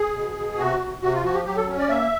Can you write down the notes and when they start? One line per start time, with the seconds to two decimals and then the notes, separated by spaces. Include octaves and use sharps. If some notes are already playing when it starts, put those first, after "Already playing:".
Already playing: G#4
0.14 B2
0.36 B2
0.58 C3 F#4
0.80 C3
1.02 C3 F#4
1.13 F4
1.23 F3 F#4
1.35 G4
1.45 F#3 G4
1.57 A4
1.67 C#4
1.79 D5
1.89 A#3 E5